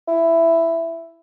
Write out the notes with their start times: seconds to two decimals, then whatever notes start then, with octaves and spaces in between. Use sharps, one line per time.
0.08 E4